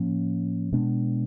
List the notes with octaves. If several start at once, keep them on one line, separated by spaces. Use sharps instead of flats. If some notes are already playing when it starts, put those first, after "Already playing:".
Already playing: A2 F3 A#3 C#4
B2 G#3 B3 D4